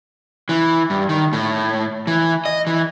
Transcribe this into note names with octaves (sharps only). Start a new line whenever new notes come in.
E3
G2
D#3
A2
E3
D#5
E3